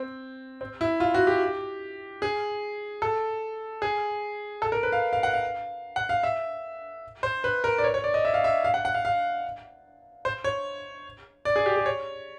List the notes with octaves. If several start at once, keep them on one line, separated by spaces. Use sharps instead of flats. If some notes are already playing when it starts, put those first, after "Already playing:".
Already playing: C4
C4
E4
F4
F#4
G4
G#4
A4
G#4
A4
A#4
B4
F5
F5
F#5
F5
F#5
F5
E5
C5
B4
A#4
D5
C#5
C#5
D5
D#5
E5
F5
E5
F5
F#5
F#5
F5
F5
C5
C#5
D5
G#4
G4
G#4
C#5